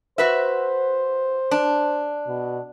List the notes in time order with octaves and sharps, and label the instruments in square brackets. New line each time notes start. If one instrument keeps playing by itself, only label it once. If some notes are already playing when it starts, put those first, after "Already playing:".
[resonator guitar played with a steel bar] F#4 B4 E5 [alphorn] C5
[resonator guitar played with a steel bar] D4
[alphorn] B2